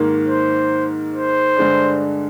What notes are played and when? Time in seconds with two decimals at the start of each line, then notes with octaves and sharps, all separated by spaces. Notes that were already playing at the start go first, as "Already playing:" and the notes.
Already playing: G#2 D#3 A#3
0.27 C5
1.14 C5
1.57 G2 D3 G#3 D4